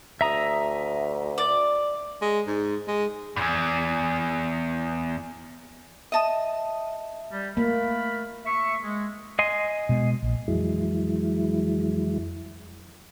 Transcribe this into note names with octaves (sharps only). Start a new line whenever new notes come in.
D2 E5 A#5 D#6
D5
G#3
G#2
G#3
E2 G2
D#5 E5 A5 D#6
G3
A3 A#3 A#4 B5
E5 C#6
G#3
D#5 G#5 C6
B2 G#3
A#1
F2 E3 F#3 G#3 E4